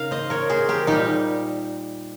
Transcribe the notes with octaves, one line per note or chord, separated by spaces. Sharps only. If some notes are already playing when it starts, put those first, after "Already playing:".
Already playing: C#3 D#4 A#4 F5
C5 D#5
A#4 C#5
G#4 C5
G4 A#4
A#2 G3 D#4 G4